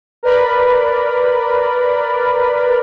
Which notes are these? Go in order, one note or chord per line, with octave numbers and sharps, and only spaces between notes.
A#4 B4 D5 B5